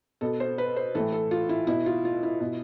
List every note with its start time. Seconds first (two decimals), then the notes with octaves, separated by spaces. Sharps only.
0.21 B2 A4
0.40 C5
0.58 B4
0.76 C5
0.95 A2 E3 A4
1.12 A4
1.31 F4
1.49 E4
1.67 B2 E4
1.86 F4
2.05 F4
2.23 E4
2.40 B2